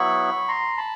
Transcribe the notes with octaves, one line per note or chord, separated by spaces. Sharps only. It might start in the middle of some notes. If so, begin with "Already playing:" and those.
Already playing: F#3 B3 E4 B5 C#6
A#5 C6
A5 B5